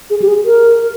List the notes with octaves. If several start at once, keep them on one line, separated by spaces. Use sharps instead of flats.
G#4
G4
G#4
A#4